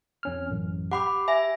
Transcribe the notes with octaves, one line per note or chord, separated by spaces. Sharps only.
F2 C#4 F6
A1 F#2
G4 F#5 B5 D6
E5 G#5 A#6